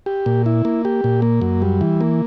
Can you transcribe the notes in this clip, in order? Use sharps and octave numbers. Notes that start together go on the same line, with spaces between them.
G4
A#2
E4
A#3
G4
A#2
A#3
F#2
G3
E3
A#3